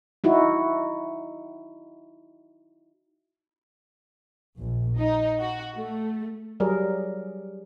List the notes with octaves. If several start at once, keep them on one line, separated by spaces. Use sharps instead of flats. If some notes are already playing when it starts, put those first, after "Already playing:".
D#4 E4 F#4
A#1
D#4
F#4
A3
F#3 G3 G#4 A#4